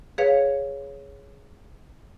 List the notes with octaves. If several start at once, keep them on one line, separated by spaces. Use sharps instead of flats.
G#4 B4 C#5 F5